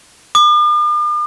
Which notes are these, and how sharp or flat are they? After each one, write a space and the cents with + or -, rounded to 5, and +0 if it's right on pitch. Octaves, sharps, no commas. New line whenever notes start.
D6 +45